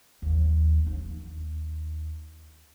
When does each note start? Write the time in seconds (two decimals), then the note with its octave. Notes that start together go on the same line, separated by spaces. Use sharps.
0.22 D#2 F3
0.85 D#2 D#4